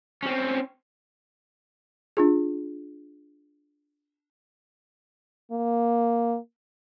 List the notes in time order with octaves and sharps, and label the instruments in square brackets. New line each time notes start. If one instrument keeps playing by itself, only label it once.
[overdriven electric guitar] C4 C#4
[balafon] D4 F4 G#4
[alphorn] A#3